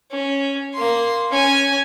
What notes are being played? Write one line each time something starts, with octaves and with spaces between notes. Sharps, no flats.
C#4
A#3 C6
C#4 G#5